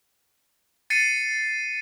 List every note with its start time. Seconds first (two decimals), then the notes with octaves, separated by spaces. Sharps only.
0.90 A6 C7 C#7 D#7